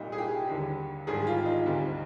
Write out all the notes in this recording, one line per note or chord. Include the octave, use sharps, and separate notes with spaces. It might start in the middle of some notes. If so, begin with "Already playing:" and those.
Already playing: C2 A#2 G3 D#4
G#4
G4
D#2 D3 G3
G#1 G#2 D#3 G3 G#4
F4
D#4
D2 C3 G3